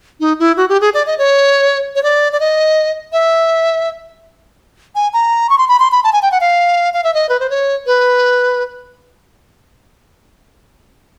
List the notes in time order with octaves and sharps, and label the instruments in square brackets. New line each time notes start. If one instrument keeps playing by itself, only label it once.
[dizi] D#4
E4
F#4
G4
G#4
D5
D#5
C#5
C#5
D5
D5
D#5
E5
G#5
A#5
C#6
C6
B5
C6
B5
A5
G#5
G5
F#5
F5
F5
E5
D#5
B4
C5
C#5
B4